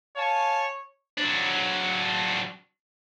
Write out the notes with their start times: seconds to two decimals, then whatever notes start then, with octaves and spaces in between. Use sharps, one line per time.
0.17 C#5 F5 G#5 A5
1.17 F#3 D4